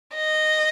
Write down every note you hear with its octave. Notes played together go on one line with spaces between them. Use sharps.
D#5